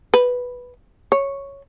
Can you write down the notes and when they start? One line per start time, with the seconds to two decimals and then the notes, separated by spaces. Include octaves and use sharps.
0.14 B4
1.12 C#5